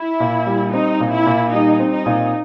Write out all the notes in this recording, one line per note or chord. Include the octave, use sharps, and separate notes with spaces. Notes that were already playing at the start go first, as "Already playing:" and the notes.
Already playing: E4
A#2
G3
C4 D#4
A#2
E4
A#2
G3 D#4
C4
D#4
A#2